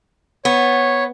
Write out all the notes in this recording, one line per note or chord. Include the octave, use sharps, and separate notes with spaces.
B3 C#5